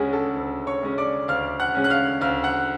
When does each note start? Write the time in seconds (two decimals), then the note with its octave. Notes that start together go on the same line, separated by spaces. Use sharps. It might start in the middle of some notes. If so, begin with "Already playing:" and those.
Already playing: D2 C#3 G#3 C#4 F#4 G#4 G#5
0.13 A4 A5
0.36 D2
0.67 C#5 C#6
0.83 C#3 G#3 C#4
0.98 D5 D6
1.28 D2 F5 F6
1.60 F#5 F#6
1.75 C#3 G#3 C#4
1.84 F#6
1.90 F5 F6
2.21 D2 F5 F6
2.44 F#5 F#6